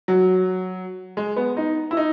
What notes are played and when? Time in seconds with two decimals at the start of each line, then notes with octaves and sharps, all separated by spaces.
0.08 F#3
1.17 G#3
1.36 B3
1.57 D#4
1.91 E4
1.97 D#4